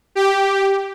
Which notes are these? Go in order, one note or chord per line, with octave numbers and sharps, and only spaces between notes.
G4